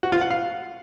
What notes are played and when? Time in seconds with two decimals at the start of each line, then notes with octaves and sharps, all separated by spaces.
0.03 F#4
0.12 F4
0.21 F#5
0.30 F5